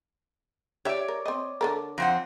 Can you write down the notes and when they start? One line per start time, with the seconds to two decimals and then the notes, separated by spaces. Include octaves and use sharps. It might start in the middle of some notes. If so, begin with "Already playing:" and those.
0.85 G4 C#5 D5 E5
1.08 A#4
1.26 C4 D#5
1.61 D3 A4 A#4
1.98 F2 C4 F#5